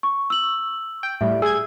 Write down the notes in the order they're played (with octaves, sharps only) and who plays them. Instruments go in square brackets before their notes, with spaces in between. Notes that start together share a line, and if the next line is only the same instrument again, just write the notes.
[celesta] C#6
E6 F#7
[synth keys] G5
[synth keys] A2 G3 [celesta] E5
[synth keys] G#4 G#6 [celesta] E6